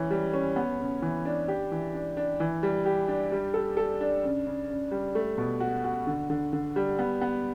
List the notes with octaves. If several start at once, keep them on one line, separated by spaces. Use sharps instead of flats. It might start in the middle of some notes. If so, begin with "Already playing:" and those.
Already playing: E3 C#4
G3
C#4
B3
C#3
E3
D4
G4
E3
D4
D4
E3
G3
G4
D4
G3
A4
A4
D4
C#3
C#3
C#3
G3
A3
B2
F#4
F#4
D3
D3
D3
G3
B3
B3